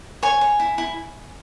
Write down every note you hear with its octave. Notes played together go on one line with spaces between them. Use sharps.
C#5 G#5
C#5
E4
E4